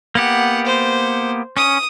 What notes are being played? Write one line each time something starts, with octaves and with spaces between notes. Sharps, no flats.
A#3 B3 G4 F#5
C5
C#4 D#6